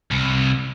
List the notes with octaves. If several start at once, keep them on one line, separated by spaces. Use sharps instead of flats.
C2